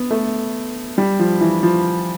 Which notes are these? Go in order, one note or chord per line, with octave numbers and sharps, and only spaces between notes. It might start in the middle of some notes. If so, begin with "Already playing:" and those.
Already playing: B3
A3
G3
F3
E3
F3